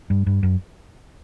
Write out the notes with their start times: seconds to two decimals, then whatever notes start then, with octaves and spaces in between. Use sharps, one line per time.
0.10 G2
0.27 G2
0.43 F#2